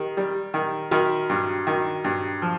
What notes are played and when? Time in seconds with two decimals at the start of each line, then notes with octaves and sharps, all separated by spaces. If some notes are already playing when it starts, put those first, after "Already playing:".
Already playing: D#3 G4
0.17 G3
0.54 D#3
0.91 D#3 F#4
1.29 G2
1.67 D#3
2.04 G2
2.42 F3